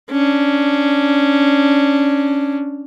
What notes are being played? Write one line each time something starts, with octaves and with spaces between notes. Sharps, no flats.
C#4 D4